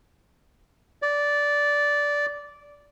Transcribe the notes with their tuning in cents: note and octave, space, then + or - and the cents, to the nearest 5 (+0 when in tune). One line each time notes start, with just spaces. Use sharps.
D5 -10